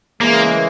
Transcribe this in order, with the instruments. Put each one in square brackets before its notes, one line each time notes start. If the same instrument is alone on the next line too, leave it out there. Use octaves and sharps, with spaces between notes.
[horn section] C#3 E3 G#3 [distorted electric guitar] A#3